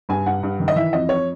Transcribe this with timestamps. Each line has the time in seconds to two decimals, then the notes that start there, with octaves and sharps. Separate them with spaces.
0.09 G2 G#5
0.26 G2 F#5
0.43 G2
0.60 D#3
0.68 D#5
0.76 E3 E5
0.93 F2 D#5
1.09 F2 C#5